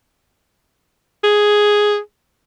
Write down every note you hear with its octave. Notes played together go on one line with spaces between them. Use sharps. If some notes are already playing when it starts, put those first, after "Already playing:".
G#4